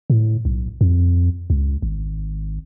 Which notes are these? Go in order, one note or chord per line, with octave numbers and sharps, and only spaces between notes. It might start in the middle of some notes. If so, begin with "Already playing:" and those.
A2
B1
F2
C#2
G#1